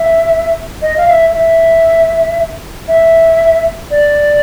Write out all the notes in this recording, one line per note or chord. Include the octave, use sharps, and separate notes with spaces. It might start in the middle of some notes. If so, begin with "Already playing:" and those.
Already playing: E5
D#5
F5
E5
E5
E5
D5